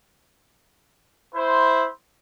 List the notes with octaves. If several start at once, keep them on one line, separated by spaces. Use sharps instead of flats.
E4 C5